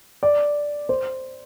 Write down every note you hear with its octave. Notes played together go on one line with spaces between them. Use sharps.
D5
C5